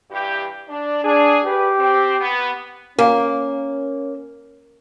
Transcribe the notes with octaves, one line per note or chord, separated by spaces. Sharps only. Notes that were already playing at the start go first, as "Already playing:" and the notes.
G2 E3 G4
D4
D4 G#4
G4 B4
C4
B3
A#3 C#4 F4 A#4 F5 G#5